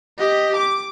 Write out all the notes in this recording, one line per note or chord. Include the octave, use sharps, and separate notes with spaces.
G4 D#5
D6